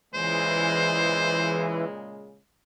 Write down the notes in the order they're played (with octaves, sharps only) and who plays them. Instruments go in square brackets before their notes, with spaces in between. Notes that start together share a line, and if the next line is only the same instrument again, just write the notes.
[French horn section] A#2 C#3 G#3 [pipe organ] E3 [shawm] C5